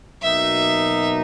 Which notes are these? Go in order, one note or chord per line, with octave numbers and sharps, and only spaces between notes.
B2 F#3 A#3 D#4 E5